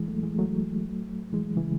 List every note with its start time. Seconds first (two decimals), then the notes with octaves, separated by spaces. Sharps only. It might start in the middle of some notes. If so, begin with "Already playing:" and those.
Already playing: E3 G#3
0.08 F#3 A3
0.23 E3 G#3
0.39 F#3 A3
1.33 E3 G#3
1.56 C#3 E3